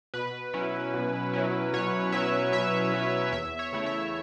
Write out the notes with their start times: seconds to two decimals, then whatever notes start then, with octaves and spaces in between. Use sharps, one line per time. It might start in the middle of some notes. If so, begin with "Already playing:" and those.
0.14 B2 B4
0.53 F#3 C#4 E4
0.94 B2
1.33 F#3 C#4 E4
1.73 B2 C#5
2.12 F#3 C#4 E4 E5
2.52 B2 E5
2.93 F#3 C#4 E4
3.32 E2 E5
3.59 C#5
3.72 C#3 A3 E4
3.86 E5